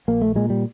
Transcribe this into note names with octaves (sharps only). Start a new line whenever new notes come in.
A#1 A#3
A3
A#2 G#3
G3